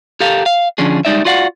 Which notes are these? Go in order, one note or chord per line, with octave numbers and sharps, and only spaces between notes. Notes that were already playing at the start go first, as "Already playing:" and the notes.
G4 A4 A#4 F5
F5
D3 F3 C#4 D4 G#4
G3 G#3 D#4 D5 E5
F4 F#4 D5 F5 F#5